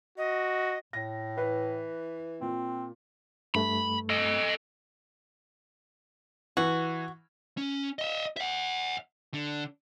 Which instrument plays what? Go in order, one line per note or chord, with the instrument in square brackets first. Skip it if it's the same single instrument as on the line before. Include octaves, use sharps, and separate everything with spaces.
[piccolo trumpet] F#4 [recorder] D#5
[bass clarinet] A2 [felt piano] A#6
[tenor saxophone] E3 [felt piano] B4
[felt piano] A#2 [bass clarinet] C4
[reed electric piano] G2 A3 [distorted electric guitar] B5
[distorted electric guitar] A4 D#5
[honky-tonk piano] E3 [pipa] F#4
[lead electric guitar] C#4
D#5 E5
E5 F#5
D3